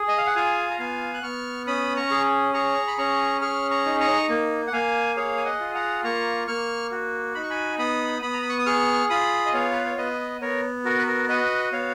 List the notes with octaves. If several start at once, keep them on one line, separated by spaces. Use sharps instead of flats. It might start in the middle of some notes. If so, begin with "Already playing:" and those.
Already playing: G#4
D#5
F5
F#5
F4 F5 G#5
A#5
B3 F5 G#5
F#6
B3 C#6 F6
C#4 B5 D#6
A#5 C#6
G#4
G#4 A#5 C#6
B5
C#4 A#5 C#6
G#4 C#6 F6
A#5 C#6
D#4
A#5 C#6
A#3
F#5
A#3 F5 G#5
G#4 C#5 F5
G#5
D#5 F#5
F4
F#5 A#5
A#3 A#5 C#6
A#3 C#6 F6
F#4
D#4 B5
C#6
G#5 B5
B3 B5 D#6
B3 B5 D#6
A#5
B5
C#6
D#6
G#4 C#6 F6
F4 B5 D#6
D#5
B3 C#5 F5
B4
C#5
B3 B4 D#5
B3 A#4 C#5
F#4 A#4
B4
A#4
F#4 B4 D#5
B3 C#5 F5